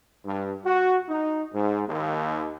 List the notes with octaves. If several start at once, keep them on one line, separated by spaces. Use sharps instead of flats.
G2
F#4
D#4
G#2
D#2